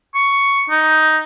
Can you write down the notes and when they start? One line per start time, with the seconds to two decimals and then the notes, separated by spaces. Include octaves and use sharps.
0.15 C#6
0.70 D#4